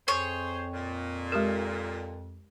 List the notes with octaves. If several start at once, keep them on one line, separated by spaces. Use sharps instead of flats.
F2 G#4 C5 C#5
A#2
G#3 G4 A#4